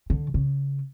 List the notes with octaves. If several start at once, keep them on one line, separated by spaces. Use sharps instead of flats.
D3
C#3